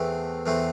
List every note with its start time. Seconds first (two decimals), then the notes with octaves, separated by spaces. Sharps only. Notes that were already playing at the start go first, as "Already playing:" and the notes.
Already playing: E2 E3 A3 C4
0.46 E2 E3 A3 C4